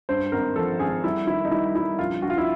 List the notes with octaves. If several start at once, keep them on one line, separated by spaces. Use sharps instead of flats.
G2 C5
G#1 A#4
F3 A4
G#1 G#4
G3 E4
D#3 E4
D#4
G3 E4
G3 E4
A#1 F4
A#1 F#4
F4
E4